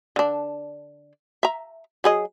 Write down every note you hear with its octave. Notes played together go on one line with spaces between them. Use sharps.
D3 D4
E5 A#5
F#3 G#4 D#5